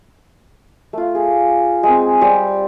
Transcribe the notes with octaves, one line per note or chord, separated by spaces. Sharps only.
A3 F4
G#4
G#3 C4
G3 C4 G4